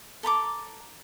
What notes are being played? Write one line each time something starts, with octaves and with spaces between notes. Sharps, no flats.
A4 A#5 B5 D6